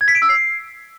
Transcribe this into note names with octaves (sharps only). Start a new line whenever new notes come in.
G#6
B6
D7
E6
C7